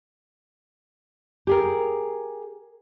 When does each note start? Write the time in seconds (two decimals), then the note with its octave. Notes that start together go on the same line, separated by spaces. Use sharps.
1.47 G4 G#4 A#4